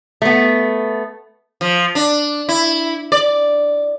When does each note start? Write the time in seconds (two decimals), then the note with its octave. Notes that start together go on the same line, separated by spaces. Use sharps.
0.22 A3 B3
1.61 F3
1.95 D4
2.49 E4
3.12 D5